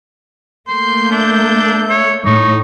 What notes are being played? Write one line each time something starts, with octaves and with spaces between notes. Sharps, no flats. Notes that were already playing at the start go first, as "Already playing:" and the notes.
A3 A#3 C6 G6
D4 E5
C#5
A2 D#4 C#6